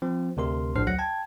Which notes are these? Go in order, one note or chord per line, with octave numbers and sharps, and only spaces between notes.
F3 C4
D2 C3 A#4 C6
A#1 A2 D4 C5 F6 C7
D2 F#3 F#5 F#6 A#6 C#7
G5 A5 G#6